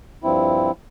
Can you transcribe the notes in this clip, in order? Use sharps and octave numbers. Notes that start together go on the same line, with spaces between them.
G2 F3 C4 E4